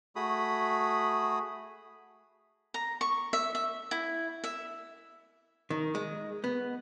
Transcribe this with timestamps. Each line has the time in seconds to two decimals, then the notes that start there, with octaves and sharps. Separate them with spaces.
0.16 A3 F#4 G#4 B5 D#6
2.74 A#5
3.01 C#6
3.33 E5
3.55 E5
3.91 E4
4.44 E5
5.70 D#3
5.95 G#3
6.44 B3